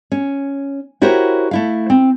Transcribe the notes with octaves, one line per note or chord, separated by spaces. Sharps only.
C#4
E4 F#4 G4 A#4 C5 C#5
A3 E4 F5
C4